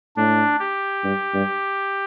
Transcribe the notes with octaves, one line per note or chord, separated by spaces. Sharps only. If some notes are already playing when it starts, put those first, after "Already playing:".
A2 D4
G4
G2
G2